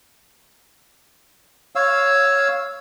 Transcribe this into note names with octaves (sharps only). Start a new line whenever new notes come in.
C#5 F5 E6